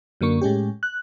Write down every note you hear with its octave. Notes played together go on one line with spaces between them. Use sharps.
F#2 D3 A#3 C#6
A2 G#3 C#4 G4
F#6